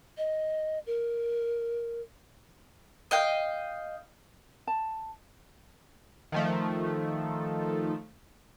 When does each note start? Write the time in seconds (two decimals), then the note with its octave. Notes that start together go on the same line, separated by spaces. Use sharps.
0.18 D#5
0.86 A#4
3.11 D#5 F5 G5
4.67 A5
6.32 D#3 F3 A3